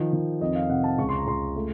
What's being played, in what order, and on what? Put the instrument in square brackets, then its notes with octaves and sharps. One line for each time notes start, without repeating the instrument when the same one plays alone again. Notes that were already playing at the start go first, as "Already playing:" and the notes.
Already playing: [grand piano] D#3 F3
D#3
F2 D#5
F5
C3 F#5
A5
C#2 C#6
C6
A#5
C#2 C6
A3